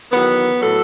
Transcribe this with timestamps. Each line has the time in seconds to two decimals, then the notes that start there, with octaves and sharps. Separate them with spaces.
0.11 E2 D#3 F#3 B3
0.61 A2 F#3 A4